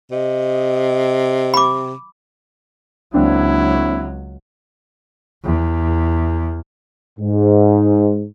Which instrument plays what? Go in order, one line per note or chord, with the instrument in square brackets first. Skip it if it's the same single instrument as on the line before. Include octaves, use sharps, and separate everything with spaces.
[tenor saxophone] C3 [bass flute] D#5
[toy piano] B5 D6
[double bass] C#2 F#3 [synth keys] A#3 C4 D4 [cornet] E4
[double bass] E2
[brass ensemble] G#2